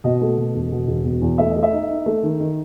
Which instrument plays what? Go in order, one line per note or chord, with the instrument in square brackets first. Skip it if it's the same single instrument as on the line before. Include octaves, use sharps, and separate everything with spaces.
[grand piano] B2 D#5
A3
B2
E1
B2
E1
B2
E2
A3 E5
D#5
A3
E5
D#4
D#4
A3
D#3
D#3